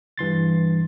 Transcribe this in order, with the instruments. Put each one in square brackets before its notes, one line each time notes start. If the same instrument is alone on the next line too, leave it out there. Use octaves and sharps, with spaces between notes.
[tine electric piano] G2 E3 C6 A6